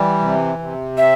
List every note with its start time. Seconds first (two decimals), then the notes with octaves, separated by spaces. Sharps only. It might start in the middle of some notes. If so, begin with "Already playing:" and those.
Already playing: E3 G3
0.20 C3
0.59 C3
0.97 C4 E5